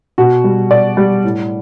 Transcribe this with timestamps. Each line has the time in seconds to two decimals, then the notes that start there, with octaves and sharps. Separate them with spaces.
0.18 B2 F#4
0.44 G3
0.71 B2 D5
0.97 G3
1.24 A2